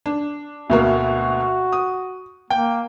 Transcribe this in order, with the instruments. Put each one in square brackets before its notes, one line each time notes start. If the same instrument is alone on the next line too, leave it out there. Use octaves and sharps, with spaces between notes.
[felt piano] D4
[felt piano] D2 B2 A#3 [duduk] F#4
[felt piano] D#6
[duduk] A#3 [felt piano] G5